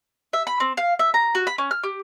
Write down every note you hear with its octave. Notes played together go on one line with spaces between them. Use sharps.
E5
B5
C4
F5
E5
A#5
F#4
B5
C#4
F6
G4